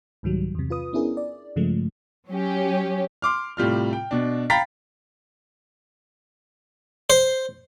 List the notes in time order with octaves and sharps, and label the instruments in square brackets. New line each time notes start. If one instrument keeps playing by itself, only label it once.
[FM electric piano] C2 G#2 D#3 F#3 G3
E2 C3
F4 B4 D#6
B3 C#4 D4 E4 G#4 A#4
D5
G2 C#3 F3 G#3 A3
[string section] F#3 C#4 G4
[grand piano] C6 D6 F6
A2 C3 G3 F4 F6
G5
B2 D4
F5 G5 A#5 B5 A6 B6
[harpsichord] C5